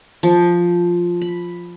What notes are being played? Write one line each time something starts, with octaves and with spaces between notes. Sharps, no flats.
F3
B5